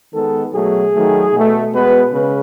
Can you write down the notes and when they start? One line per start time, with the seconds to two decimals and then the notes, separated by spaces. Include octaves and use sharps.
0.13 D#3 G#3 B3 A4
0.53 B2 F#3 A3 G#4
0.93 D#3 F#3 A3
1.33 B2 A3
1.73 B2 G#3 B3 B4
2.12 C#3 G#3 B4